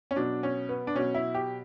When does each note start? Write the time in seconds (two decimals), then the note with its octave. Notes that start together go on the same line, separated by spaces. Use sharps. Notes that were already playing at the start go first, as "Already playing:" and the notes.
0.11 C#4
0.16 B2 F#3 D4
0.43 C#4
0.69 B3
0.87 D4
0.95 B2 F#3 C#4
1.15 E4
1.34 G4